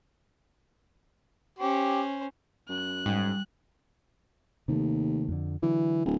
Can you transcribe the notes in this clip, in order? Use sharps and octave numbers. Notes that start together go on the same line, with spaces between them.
C#4 G4 C5
F#2 F#6
G#2 G3
D#2 C3 D#3 A3
F2 D3
D3 E3 F#3
D1